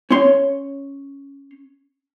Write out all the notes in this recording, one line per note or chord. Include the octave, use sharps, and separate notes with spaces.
C#4 C#5 C6